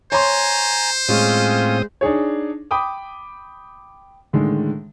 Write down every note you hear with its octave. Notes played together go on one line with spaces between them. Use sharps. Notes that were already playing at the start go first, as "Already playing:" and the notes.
C5 C#5 G#5 A#5 C6
A2 G#3 C4 C#4 F4 C#5 D#6
D4 D#4 G#4 C#5
G5 B5 D6 D#6
A2 D3 D#3 G#3